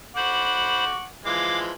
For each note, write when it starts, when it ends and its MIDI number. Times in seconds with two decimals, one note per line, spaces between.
0.16 0.84 72
0.16 1.06 78
0.16 0.84 83
0.16 1.06 85
0.16 1.06 86
1.25 1.70 52
1.25 1.70 53
1.25 1.70 56
1.25 1.59 77
1.25 1.59 86